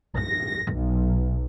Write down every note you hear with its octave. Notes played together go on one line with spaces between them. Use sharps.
A#6
B1